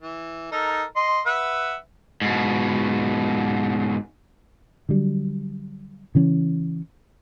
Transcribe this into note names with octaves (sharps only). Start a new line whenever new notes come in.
E3
D#4 A4 A#4
D#5 C6
B4 E5 F#5
G#2 B2
D3 F#3 G3
C#3 E3 C#4